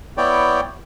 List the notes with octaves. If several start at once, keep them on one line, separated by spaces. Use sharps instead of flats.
B3 E4 C#5 D5 G5